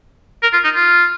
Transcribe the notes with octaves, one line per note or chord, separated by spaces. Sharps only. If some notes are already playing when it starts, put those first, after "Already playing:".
A#4
F4
D#4
F4